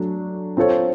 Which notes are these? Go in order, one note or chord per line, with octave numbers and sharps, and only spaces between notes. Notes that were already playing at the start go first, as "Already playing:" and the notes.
Already playing: F#3 A3 D4
C4 F4 A4 C#5